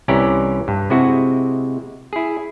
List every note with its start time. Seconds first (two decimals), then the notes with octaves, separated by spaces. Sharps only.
0.08 C2 E3 C#4 G4 D5 A#5
0.68 G2
0.90 C3 G#3 C4 E4 F#4 D#5
2.13 E4 G#4